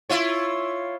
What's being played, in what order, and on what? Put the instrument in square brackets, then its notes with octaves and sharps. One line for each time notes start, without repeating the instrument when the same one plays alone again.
[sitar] E4 F4 C#5